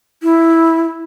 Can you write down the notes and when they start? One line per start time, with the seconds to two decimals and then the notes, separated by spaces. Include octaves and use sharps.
0.23 E4